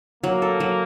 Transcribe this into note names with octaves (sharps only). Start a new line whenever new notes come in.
F#3 A#3
A4
F#3